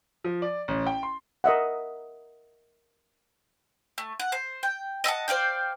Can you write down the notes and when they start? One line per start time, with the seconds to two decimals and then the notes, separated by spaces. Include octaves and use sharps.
0.24 F3
0.42 D5
0.68 A1
0.86 G5
1.03 C6
1.44 A#4 D#5 E5 F#5
3.98 A3
4.20 F#5
4.32 C5
4.63 G5
5.04 D#5 E5 F#5 A5
5.28 C5 D5 F5 G5